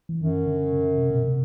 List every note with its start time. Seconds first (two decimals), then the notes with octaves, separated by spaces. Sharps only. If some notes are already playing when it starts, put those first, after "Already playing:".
0.09 E3
0.21 F#2 D#3
0.47 D3
0.72 C#3
0.98 C3
1.11 B2
1.24 C3